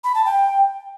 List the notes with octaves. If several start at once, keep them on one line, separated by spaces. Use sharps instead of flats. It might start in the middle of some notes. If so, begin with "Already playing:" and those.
B5
A5
G5